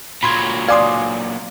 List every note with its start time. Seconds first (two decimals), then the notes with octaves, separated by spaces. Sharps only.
0.23 A#2 F#3 B5 C6 G#6
0.68 D5 F5 G#5 C6 D6 D#6